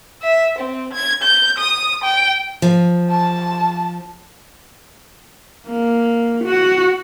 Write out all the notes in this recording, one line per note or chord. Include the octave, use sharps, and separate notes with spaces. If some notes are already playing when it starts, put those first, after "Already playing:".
E5
C4
G#6
G6
D#6
G5
F3
A5
A#3
F#4